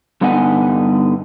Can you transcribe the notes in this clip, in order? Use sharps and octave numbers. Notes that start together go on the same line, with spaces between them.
G2 D3 B3 D#4 F#5 G#5